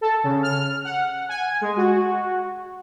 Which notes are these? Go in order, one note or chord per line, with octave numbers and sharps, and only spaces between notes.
A4
C#3
F6
F#5
G#5
G#3
F#4